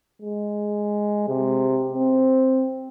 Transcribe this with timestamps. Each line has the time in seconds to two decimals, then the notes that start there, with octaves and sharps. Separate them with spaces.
0.22 G#3
1.29 C3
1.93 C4